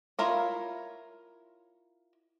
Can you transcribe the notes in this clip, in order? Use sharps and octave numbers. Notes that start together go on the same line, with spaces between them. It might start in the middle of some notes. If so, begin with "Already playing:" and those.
E4 F4 A#4 C#5